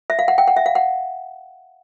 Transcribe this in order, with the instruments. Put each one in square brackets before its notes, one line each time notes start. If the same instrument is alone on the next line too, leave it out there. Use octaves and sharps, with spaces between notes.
[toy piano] E5
F5
F#5
G5
F#5
E5
F5
F#5